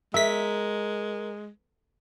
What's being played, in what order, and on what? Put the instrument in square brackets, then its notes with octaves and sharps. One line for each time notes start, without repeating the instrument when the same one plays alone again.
[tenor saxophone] G#3 [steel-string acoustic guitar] A#4 [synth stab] E5 B6